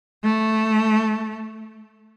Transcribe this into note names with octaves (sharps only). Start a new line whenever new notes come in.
A3